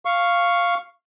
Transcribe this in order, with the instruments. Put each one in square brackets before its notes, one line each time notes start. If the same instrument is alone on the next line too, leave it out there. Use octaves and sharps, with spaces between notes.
[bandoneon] F5 C#6